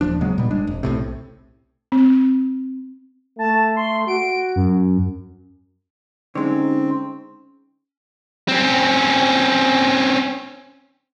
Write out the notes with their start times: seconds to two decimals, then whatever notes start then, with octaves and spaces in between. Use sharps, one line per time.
0.01 D#1 E2 F3 D4
0.21 C#3 F#3 G#3 B3
0.38 A#2 G3
0.51 F#1 G#3 D4
0.67 F1
0.83 B1 A2 C3
1.92 C4
3.39 A3 A5
3.76 C6
4.08 F#4 D7
4.56 F#2
6.35 D3 G#3 C4 C#4 D#4
8.48 C4 C#4